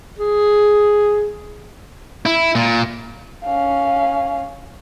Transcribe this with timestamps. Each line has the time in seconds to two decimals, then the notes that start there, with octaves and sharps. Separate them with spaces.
0.19 G#4
2.26 E4
2.55 A#2
3.45 C#4 F5